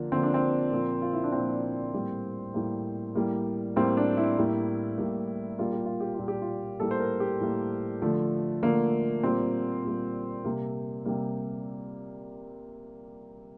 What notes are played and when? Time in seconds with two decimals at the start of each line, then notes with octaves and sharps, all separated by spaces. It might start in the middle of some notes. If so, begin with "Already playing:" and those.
Already playing: D3 F3 A#3
0.12 D3 F3 A#3 C4
0.23 D4
0.34 C4
0.72 A#2 F3 A#3
1.02 F4
1.13 E4
1.23 D4
1.32 A#2 F3 A#3 C4
1.94 A2 G3 A#3
2.54 A2 G3 A#3
3.15 A2 G3 A#3
3.76 A2 G3 A#3 C4
3.97 D4
4.17 E4
4.38 A2 G3 A#3
4.98 A2 G3 A#3
5.59 A#2 G3 A#3 F4
5.72 G4
5.86 F4
6.00 G4
6.14 F4
6.19 A#2 G3 A#3
6.28 G4
6.42 F4
6.80 A2 G3 A#3 A4
6.91 C5
7.00 A#4
7.20 G4
7.41 A2 G3 A#3
8.02 D3 F3 A3
8.62 D3 F3 A3 A#3
9.23 A#2 G3 A#3 C4
9.84 A#2 G3 A#3
10.45 C3 G3 A#3
11.06 C3 G3 A#3